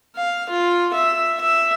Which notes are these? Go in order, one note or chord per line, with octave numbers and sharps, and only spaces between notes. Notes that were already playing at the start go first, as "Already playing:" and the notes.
F5
F4
E5
E5